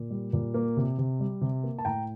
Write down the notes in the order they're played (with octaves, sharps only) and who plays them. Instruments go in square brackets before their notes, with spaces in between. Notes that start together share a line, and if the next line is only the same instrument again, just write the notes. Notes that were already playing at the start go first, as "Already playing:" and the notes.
Already playing: [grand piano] A#2
G3
A#2
A#3
C3
C3
G3
C3
A#3
A5
A2 G5 A#5